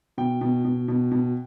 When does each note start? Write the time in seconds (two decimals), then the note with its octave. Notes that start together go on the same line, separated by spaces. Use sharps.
0.18 B2 G5
0.41 B2
0.65 B2
0.88 B2
1.11 B2